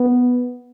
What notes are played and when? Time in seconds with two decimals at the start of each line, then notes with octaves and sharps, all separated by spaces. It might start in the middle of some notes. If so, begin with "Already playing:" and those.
Already playing: B3